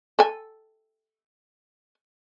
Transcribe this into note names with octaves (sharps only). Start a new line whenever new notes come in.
A4 G#5